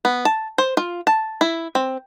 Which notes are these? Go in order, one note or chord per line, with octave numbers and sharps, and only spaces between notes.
B3
A5
C5
F4
A5
E4
C4